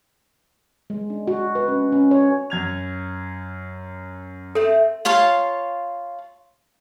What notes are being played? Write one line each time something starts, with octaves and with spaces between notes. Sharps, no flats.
G#3
D4
F#4
B4
C#4
C#4
C#5
F#2 G#6 F7
A3 C4 A4
F4 C#5 F5 A5